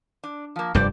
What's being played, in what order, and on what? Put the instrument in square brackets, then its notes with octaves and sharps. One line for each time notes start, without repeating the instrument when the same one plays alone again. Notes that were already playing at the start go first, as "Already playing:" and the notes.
[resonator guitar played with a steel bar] D4
F3 A#3
[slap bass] F1 G2 G3 [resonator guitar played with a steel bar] G4 C5 D5